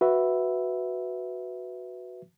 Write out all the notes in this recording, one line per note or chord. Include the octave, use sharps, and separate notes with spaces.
F#4 B4 E5